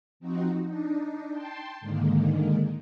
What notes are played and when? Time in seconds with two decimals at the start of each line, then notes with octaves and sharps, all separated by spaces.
0.20 F3 C4 D#4 F#4
0.65 D4 D#4
1.31 G5 A5 C6
1.81 G#2 D3 D#3 G#3 A#3